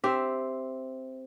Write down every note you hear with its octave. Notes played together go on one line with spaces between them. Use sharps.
C4 G4 E5